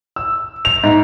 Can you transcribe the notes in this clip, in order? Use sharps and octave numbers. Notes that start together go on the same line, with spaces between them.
E6
F7
G#2